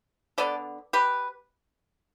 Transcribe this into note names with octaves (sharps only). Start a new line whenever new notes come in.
D3 B3 A4 D5
G4 B4